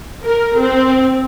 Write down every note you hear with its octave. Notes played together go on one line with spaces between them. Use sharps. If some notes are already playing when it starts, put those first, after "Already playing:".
A#4
C4